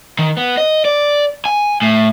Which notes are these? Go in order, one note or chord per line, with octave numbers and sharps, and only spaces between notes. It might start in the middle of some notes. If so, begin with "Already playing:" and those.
D#3
B3
D#5
D5
G#5
A2